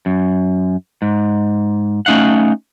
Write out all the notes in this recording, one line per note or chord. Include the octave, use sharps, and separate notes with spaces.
F#2
G#2
A3 C#4 D#4 F5 F#5